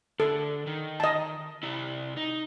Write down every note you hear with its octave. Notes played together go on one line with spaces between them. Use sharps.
D3 A4
D#3
D#5 A5
C3 E4
D#4